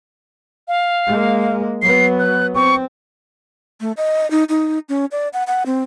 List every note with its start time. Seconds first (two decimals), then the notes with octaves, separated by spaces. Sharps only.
0.68 F5
1.07 G#3 A#3
1.82 F#3 B3 C7
2.19 F#6
2.55 C4 C#6
3.81 A3
3.97 D#5
4.31 D#4
4.49 D#4
4.89 C#4
5.11 D5
5.33 F#5
5.47 F#5
5.66 C4